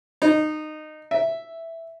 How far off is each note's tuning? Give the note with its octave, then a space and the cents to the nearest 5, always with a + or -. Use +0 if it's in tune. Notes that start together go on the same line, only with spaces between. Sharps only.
D#4 -20
E5 +0